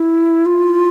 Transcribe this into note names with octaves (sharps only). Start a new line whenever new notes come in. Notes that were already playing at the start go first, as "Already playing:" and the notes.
Already playing: E4
F4